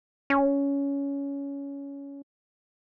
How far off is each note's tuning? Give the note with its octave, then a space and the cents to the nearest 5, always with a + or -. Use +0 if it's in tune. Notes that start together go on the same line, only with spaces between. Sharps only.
C#4 +15